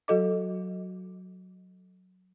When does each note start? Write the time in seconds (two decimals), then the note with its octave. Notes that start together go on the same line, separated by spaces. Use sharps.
0.08 F#3 F#4 A4 D#5 D6